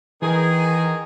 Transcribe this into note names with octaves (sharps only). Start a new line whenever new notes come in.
D#3 E3 G#4